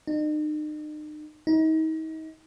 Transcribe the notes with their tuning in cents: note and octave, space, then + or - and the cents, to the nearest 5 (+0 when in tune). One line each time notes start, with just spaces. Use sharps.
D#4 -40
D#4 +35